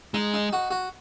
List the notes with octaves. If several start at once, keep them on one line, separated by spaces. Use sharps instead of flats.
G#3 D#4
D#4
F#4
F#4